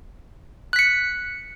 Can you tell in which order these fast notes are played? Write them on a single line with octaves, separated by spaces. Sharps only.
F#6 B6 C#7